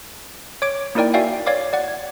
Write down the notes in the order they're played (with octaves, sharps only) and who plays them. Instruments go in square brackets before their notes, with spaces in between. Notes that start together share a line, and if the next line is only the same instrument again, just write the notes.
[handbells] C#5 D6 D7
A#3 D#4 E4 A#4 D5 G5
F#4 D5 E5 F5 G5 G#5
C#5 D5 F5 D6
D5 F#5
G#6